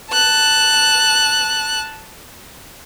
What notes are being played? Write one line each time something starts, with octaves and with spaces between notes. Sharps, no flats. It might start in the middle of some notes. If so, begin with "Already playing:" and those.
A5 F#6